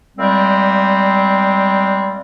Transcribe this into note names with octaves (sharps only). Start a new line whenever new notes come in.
A#2 G3 G#3 C4